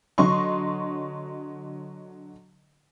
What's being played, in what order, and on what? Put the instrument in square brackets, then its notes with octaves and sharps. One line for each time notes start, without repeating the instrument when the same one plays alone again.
[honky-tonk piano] D3 F#3 D#5 C6 C#6